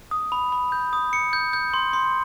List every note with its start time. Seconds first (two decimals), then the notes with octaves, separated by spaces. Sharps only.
0.11 D#6
0.32 B5
0.52 B5
0.72 G6
0.93 D#6
1.13 C#7
1.33 G6
1.53 G6
1.74 C6
1.93 C6